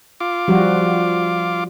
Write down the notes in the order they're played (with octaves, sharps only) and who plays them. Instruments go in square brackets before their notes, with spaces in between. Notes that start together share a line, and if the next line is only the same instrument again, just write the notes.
[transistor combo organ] F4 D6
[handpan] F3 G3 F#4